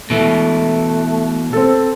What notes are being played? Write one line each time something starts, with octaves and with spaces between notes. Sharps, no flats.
B2 E3 A3
C4 A4